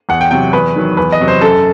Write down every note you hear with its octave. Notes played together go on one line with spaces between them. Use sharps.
E2 F#5
G5
C3 F#3 G5
E2 B4
D#3 F#3
E2 B4
D#5
C3 F#3
C5
F#2 A4